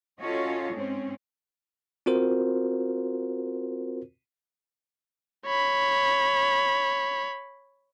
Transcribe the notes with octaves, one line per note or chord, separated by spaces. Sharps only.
C#4 F4 F#4 A4 C#5 D#5
G#2 C4 C#4
C4 F4 F#4 A#4 C5
C#5 B5